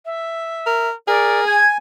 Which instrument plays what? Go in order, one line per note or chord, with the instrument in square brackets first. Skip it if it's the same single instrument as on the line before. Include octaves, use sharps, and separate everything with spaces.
[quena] E5
[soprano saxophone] A#4
[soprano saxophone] G#4 [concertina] A#4 [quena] D5
[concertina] G#5 [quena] G#6